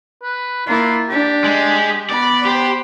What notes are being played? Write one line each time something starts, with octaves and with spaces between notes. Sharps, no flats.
B4
A#3 E4 F4
D4 G4
G#3
B3 D5 B5
G4 C5